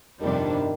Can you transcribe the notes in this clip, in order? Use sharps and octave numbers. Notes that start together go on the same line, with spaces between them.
G1 F2 C3 D#3 G3 D4